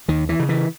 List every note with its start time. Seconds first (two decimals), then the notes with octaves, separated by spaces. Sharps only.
0.08 D#2 D#3
0.29 E3
0.40 C#3
0.49 E3